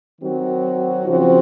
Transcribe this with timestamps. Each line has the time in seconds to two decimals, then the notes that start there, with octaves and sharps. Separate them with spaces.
0.21 D#3 F#3 C4 F#4
1.07 C#3 F3 C4 F#4